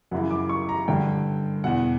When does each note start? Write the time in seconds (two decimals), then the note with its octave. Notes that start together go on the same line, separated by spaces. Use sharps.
0.11 F#2 C#3 E3 F#5
0.31 D6
0.49 C#6
0.69 A#5
0.88 G2 D3 G5
1.64 E2 B2 F#5